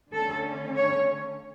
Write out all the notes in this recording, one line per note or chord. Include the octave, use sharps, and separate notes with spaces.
D3 A3 C#4 A4
C#5